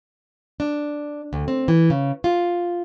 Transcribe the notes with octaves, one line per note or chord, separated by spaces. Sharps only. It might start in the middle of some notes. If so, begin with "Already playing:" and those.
D4
D2
C4
E3
C#3
F4